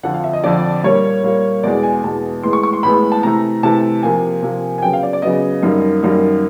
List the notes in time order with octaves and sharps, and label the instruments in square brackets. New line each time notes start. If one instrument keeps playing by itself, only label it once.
[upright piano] F2 D3 F3 F#5
F5
E5
D#5
F2 D3 F3 D5
A#2 G3 A#3 C#5
A#2 G3 A#3
E2 B2 G#3 D5
G#5
E2 B2 G#3 A5
A2 E3 G#3 B3 C6
C#6
C#6
C6
A2 E3 G#3 B3 B5
A5
C3 E3 A3 A#5
C3 E3 A3 A5
C3 F3 A#3 G#5
C3 F3 A#3
G#5
C#3 F#3 B3 G5
F5
D5
D5
C#3 F#3 B3 D#5
F#2 D#3 G3 A#3
F#2 D#3 G3 A#3